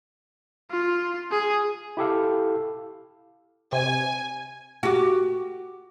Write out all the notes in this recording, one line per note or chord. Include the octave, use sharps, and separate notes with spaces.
F4
G#4
E4 G4 A4 F5
C3 G#5
F#4 G4